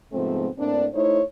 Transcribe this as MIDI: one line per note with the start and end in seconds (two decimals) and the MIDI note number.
0.13 0.48 44
0.13 0.48 48
0.13 0.48 53
0.13 0.48 57
0.13 0.48 59
0.13 0.48 60
0.58 0.86 45
0.58 0.86 58
0.58 0.86 60
0.58 0.86 62
0.93 1.21 57
0.93 1.21 63
0.93 1.21 64
0.93 1.21 72
0.93 1.21 73